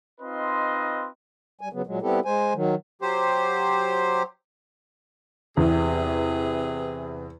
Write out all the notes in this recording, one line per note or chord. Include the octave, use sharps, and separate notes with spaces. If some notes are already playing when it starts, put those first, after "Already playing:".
C4 D#4 F4 B4 D#5 C6
G3 G#5
C#3 F#3 B3
A#2 F#3 G#3
G3 B3 C4 E4 G4 A4
G#3 C5 G#5
D#3 F#3
F#3 G4 C5
E2 C3 G#4 B4